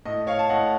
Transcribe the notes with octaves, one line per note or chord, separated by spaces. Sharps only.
A2 D#5
C#5 F5
A5
A2 D#5 F#5